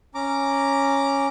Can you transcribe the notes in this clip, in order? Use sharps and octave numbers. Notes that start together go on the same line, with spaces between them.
C#4 A#5 D6